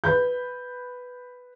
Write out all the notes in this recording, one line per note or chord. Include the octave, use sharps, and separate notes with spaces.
B4 B5 G6